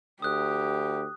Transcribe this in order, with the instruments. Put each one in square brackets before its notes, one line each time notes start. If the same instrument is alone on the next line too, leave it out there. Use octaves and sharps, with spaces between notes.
[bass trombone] D2 [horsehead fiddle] G4 [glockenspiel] D#6 F#6